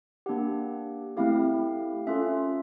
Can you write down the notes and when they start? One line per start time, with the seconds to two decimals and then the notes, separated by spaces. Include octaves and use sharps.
0.26 A#3 D4 G4 F#5
1.17 A3 C4 E4 G4 F5
2.07 C#4 F4 A4 E5